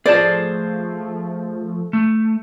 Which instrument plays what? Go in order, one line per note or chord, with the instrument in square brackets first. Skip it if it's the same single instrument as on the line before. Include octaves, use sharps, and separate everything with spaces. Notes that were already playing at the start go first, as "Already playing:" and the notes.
[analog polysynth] F3 A3 [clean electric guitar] G#4 C5 A5 [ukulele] D5
[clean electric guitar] A3